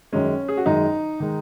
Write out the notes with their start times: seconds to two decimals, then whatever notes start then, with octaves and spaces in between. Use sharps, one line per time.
0.12 F#2 D#3 G#3 C#4
0.48 G#4
0.57 F#4
0.66 F#2 D#3 G#3 D#4
1.20 D#3 G#3